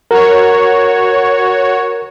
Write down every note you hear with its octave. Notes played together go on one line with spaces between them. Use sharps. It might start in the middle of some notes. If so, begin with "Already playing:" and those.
F#4 A#4 C#5